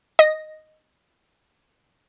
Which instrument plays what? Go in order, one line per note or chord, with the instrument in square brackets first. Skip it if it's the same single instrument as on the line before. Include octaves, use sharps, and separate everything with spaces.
[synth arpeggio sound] D#5 A#6